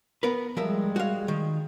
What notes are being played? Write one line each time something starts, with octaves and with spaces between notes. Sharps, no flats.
B3 A#4 B4
F3 G3 G#3 A#4 E5
F#4 F5
D#3